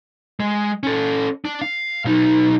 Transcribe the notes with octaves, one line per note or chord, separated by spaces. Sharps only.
G#3
C#4 A4
D4
F5
B1 D#4